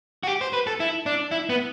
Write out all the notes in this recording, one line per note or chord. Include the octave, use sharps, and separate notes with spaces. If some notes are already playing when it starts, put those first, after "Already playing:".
F#4
G4
C5
B4
A4
E4
D4
E4
B3